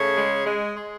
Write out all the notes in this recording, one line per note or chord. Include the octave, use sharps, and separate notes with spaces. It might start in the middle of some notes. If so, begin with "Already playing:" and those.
Already playing: C#3 A3 C#5
G#3
G#3
G#3